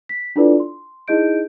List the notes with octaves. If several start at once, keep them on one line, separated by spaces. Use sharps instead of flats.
B6
D4 E4 F4 A4 B4 D5
C6
D#4 E4 G#4 D#5 G6 D7